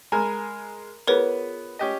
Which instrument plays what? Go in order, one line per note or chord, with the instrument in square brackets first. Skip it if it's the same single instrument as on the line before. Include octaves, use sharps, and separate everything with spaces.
[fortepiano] G#3 A#4 G#5 [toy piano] A#5 B5
[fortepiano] B3 [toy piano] F4 G#4 B5 [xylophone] A#4 B4 C#5
[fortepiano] C#4 G4 D#5